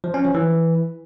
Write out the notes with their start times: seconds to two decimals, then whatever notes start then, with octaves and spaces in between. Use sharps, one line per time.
0.04 F3
0.14 C#4
0.24 F3
0.34 E3